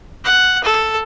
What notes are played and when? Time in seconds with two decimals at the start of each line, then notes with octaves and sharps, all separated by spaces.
0.25 F#5
0.64 A4